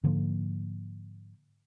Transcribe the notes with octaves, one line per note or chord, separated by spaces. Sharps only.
G#2 D3 F3 A#3